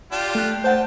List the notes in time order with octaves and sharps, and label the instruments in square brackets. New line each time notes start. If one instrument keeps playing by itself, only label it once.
[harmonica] D4 F4 G4
[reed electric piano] A3 F#6
[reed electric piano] C5 F#5 [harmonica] G5 A5